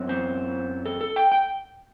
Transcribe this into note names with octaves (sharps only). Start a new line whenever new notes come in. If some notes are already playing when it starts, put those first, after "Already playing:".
Already playing: F#2 F#3 C4
C5
A4
A4
G5
G5